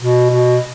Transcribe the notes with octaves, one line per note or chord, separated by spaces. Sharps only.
B2
B2